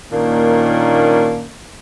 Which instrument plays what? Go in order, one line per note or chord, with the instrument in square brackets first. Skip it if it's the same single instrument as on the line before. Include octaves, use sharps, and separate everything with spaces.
[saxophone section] A#2 D#3 A#3 C#4 D4